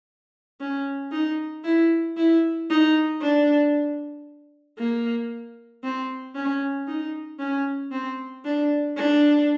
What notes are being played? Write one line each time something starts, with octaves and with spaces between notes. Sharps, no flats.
C#4
D#4
E4
E4
D#4
D4
A#3
C4
C#4
D#4
C#4
C4
D4
D4